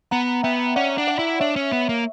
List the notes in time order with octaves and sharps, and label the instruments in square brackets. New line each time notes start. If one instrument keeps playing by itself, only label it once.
[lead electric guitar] B3 [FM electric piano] F#5 A#5
[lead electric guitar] B3 [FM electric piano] E5 G5
[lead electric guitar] C#4 [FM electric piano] D5 F#5
[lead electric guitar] D4
[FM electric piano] D5 F#5
[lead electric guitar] E4
[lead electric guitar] D4 [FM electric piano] C#5 E5
[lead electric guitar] C#4
B3
A#3